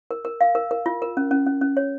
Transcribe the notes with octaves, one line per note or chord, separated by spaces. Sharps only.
A#4
A#4
F5
A#4
A#4
F4
A#4
C#4
C#4
C#4
C#4
C#5